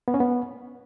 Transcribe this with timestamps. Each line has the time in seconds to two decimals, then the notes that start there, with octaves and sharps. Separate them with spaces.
0.08 B3
0.14 C#4
0.20 B3